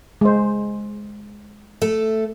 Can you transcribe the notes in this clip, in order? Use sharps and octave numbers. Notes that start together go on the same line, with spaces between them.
G#3 C5
A3 A4